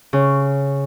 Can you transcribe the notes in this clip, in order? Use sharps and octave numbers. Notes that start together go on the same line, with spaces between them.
C#3